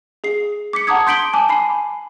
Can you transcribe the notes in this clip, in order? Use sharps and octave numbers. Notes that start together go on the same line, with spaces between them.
G#4 C7
D6 B6 C#7
F#5 A5 A#5 D6 D#6 G#6
C6 G6 B6 D7 F#7 G7
G#5 A5 D6
G#5 B5 C7